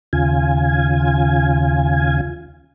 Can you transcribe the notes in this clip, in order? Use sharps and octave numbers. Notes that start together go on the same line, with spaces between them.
D#2 C#3 F4 G#5